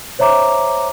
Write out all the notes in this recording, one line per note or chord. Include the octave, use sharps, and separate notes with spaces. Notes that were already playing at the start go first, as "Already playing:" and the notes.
C5 C#5 E5 A#5 D6